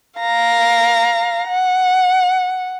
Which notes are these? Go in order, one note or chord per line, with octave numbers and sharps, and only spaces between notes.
F5 A#5
F#5